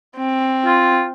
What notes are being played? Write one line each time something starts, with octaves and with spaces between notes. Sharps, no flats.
C4
F4